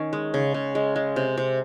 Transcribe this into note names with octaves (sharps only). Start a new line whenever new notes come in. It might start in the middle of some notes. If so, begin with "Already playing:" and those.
Already playing: D#3 C#4
G#3
C#3
C#3
G#3
G#3
C3
C3